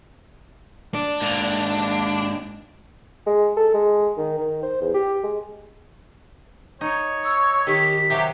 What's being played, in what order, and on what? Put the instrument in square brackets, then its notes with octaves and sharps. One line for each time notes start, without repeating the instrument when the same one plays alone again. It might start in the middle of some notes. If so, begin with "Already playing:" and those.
[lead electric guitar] D4
[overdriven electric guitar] G#2 A#3
[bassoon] G#3
A4
G#3
D#3
D#3
C5
E2
G4
G#3
[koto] D#4 [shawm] C#5
[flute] C#6 [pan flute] E6
[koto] D#3 [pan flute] G4 [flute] B6
[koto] C3 F#3 [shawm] G4 [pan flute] E5